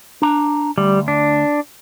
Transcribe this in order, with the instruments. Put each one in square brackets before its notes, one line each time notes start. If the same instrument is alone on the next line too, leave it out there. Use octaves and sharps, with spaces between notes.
[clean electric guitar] D4 A#5
[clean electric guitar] D2 [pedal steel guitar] G3
[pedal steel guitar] D4